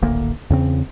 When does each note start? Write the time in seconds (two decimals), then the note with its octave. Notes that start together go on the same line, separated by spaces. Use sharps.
0.02 D1 G#1 D2 A#3
0.50 E2 C#3 C4